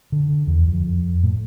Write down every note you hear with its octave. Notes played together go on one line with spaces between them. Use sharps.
D3
E2
F2
A2